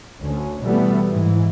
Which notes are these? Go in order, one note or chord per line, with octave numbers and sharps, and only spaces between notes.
D2 C#4
B2 E3 G3 A3 B3
G#2 E3